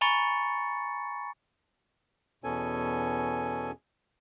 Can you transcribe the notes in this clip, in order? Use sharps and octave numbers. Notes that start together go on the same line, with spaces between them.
G#5 A#5 B5 C#6 A6 C#7
E2 B2 B3 C#4 A4 G#5